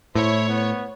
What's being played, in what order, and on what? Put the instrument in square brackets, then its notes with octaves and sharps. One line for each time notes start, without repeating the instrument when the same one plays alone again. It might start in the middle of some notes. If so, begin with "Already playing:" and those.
[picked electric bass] A2 [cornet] E4 [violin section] C5 C#5
[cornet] B3